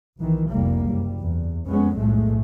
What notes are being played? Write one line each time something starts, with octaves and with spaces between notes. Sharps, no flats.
B1 D#3 E3
F1 C2 G3 A#3
F#1 G3
E2
F1 F2 G#3 B3 C#4
B1 F2 A2 G#3 A3